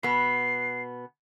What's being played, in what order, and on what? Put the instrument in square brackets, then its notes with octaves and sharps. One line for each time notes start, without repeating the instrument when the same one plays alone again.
[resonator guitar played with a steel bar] B2 B3 [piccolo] C7